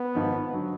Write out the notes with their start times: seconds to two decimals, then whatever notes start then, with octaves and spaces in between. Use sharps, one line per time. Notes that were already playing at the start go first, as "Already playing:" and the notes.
Already playing: B3
0.15 G#1 G#2 F3
0.54 D3 F#3